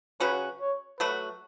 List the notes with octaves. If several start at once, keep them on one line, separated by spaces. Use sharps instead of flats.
C#3 F#3 C#4 F#4 B4
C#5
F#3 A3 F#4 B4